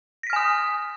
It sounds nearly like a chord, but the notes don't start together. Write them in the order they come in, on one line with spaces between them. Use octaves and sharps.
A#6 B6 F6 G#5 D#6